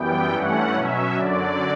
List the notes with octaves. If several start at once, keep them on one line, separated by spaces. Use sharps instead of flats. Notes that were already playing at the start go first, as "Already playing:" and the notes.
Already playing: F#2 E3 G3 B3 G5
G2 E3 A3 C#4 F#5
B2 F#3 C#4 E5
F#2 D3 F#3 D5